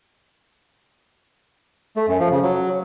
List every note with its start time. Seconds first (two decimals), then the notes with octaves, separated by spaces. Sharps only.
1.97 A3
2.08 F#2
2.20 F3
2.31 C#3
2.43 F#3